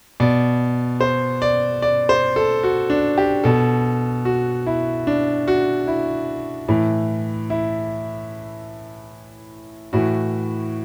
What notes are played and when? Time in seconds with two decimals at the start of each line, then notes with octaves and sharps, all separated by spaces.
0.20 B2 D5
1.01 C5
1.42 D5
1.82 D5
2.09 C5
2.36 A4
2.63 F#4
2.90 D4
3.18 G4
3.44 B2 A4
4.25 F#4
4.66 E4
5.07 D4
5.48 F#4
5.87 E4
6.68 A2 E3
7.50 E4
9.93 A2 E3 F#4